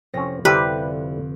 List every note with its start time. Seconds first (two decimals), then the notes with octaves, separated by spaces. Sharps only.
0.14 F1 C4 C#4 A#6
0.45 F2 D3 G3 E4 G4 B4 C5